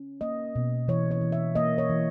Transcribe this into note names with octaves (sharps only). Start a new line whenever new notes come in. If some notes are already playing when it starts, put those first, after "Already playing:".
Already playing: C#4
A#3 D#5
B2
E3 C#5
C#5
E3
E5
A#3 D#5
C#5
E3